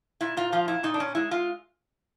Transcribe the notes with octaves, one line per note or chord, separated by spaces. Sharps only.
A#2 E4
A#2 F4
F3 F4
A#2 E4
A#2 D#4
D4
A#2 C#4
G#3 E4
G#3 F4